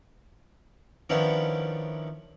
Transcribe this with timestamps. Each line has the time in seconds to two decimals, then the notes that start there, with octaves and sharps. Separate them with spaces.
1.10 D#3 F3 B3 C#4 D4 E4